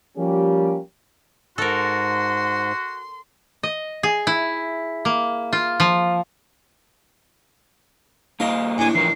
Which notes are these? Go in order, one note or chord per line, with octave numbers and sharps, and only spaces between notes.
F3 G3 A#3 C#4 G4
G#2 F#4 A4 A#4 C6
D#5
G#4
E4
A#3
F4
F3
A#3 D#4 C5 D#5 F5
A2 D4 G#5
E3 F3 A#4 C7